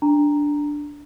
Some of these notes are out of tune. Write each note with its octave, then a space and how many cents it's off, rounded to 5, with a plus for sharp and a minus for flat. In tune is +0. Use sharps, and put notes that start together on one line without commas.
D4 -5 A#5 -5